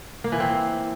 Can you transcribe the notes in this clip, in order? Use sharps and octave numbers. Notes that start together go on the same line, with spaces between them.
A#3
E3
C4